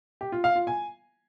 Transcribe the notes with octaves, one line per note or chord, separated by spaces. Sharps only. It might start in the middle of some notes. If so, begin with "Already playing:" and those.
G4
F4
F5
F4
G#5